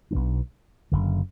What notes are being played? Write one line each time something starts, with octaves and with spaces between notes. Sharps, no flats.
B1 B2 G#3 D4
F#1 F#2 D3